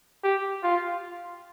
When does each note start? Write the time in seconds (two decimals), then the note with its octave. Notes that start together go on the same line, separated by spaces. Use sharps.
0.24 G4
0.63 F4